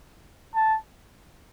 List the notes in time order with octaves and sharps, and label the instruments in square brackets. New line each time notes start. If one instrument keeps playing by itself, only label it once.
[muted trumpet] A5